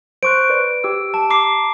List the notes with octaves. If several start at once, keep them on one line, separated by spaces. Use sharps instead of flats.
C5 C#6 F#6 D7
B4 D5
G4 E6
A5
A#5 D6 C7